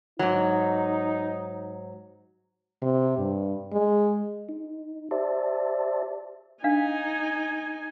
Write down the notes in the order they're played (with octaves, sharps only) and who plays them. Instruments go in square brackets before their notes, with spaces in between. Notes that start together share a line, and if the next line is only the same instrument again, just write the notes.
[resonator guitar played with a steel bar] G#2 F#3 [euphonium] D#4
[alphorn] C3
G2
G#3
[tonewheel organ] D#4
G4 C5 D5 E5 A5
[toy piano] D4 F5 [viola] D#4 G#5